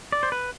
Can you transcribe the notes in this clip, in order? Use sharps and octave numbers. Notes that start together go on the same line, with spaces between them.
D5
C5
B4